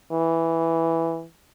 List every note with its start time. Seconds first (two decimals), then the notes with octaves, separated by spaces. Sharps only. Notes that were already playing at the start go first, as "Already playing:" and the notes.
0.12 E3